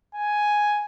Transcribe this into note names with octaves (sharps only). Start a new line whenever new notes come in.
G#5